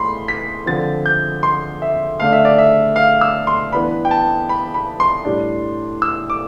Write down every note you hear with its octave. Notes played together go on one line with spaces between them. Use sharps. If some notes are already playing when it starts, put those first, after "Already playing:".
Already playing: A2 A3 B5 C6
B6
D3 F3 C4 A6
G6
C6
E5
D3 A3 D4 F5
E5
D5
E5
F5
E6
C6
E3 B3 D4 B5
G5
A5
B5
B5
C6
A2 G3 D4
E6
D6